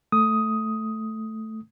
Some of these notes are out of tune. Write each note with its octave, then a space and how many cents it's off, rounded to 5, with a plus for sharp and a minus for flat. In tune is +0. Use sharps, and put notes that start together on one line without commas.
A3 +0 D#6 +10